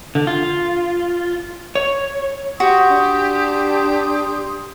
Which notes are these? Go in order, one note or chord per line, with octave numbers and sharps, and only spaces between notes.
D3
F4
C#5
F#4 G4 C6 D#6
D4